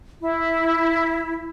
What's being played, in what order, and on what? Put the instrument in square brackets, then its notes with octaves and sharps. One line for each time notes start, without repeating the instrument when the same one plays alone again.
[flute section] E4